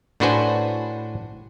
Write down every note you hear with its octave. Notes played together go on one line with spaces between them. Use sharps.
A2 D4 F#4 B4 C5 G#5